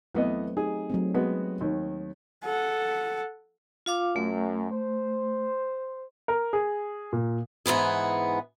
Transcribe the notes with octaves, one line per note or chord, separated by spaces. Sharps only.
E2 F#3 A3 B3 C4 D#5
D#4 G4 G#4
F#3 A3 C4
G#3 B3 F#4
D#2 D#3
A4 F#5
F4 F5 D6
F#2 A3
C5
A#4
G#4
A#2
G#2 E3 B3 G#4